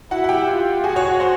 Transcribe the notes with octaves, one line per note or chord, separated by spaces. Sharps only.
E4 F#4 F#5
F#5
G4 G5
F4
F#4 G#4 G#5
C#5 C#6
C5 C6